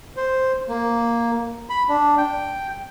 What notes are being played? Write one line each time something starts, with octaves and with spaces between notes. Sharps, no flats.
C5
A#3
B5
D4
G5